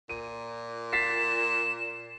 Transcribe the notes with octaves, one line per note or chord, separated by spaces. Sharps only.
A#2 D#7
A6 B6 C7 E7